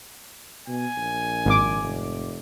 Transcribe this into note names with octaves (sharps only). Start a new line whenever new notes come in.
B2 G#5
A#1
G#1 D6
F1